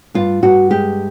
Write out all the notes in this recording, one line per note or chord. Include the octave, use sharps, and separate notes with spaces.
G2 F4
G2 F#4
G#3 G4